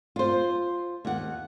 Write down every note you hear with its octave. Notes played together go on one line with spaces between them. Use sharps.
F4 C5
D#2 F#5